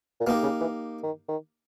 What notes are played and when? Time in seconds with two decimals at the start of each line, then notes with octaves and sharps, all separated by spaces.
0.20 A#2
0.27 B2 A#3 D#4 G4
0.43 C#3
0.61 E3
1.03 D#3
1.29 D#3